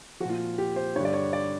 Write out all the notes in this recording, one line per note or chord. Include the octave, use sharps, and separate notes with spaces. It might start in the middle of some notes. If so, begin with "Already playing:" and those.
A#2 F3 F4 F#4
G4
C5
G2 D3 G3 C#5
D5
C#5
D5